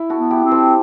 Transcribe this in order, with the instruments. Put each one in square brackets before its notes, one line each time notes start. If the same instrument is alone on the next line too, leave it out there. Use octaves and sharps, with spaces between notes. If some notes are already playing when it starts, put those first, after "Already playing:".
Already playing: [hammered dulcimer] E4
F#4 A4
[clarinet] B3
[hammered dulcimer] E4 G4
[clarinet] C4
[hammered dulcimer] A4 C5